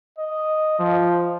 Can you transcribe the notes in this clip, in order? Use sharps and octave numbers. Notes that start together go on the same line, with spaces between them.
D#5
F3